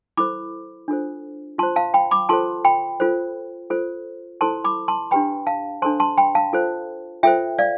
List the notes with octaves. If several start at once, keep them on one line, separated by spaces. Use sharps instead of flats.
E4 A4 C5 B5 D6
D4 F4 A4 C5
F4 C5 A5 C6
F5 A5
G5 B5
B5 D6
F4 A4 C5 A5 C6
G5 B5
F4 A4 C5
F4 A4 C5
E4 A4 C5 A5 C6
B5 D6
A5 C6
D4 G4 B4 G5 B5
F5 A5
D4 A4 C5 A5 C6
A5 C6
G5 B5
F5 A5
F4 A4 C5
F4 A4 C5 E5 G5
D5 F5